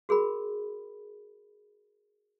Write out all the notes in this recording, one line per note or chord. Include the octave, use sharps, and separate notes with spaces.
F#4 G#4 A#4 B5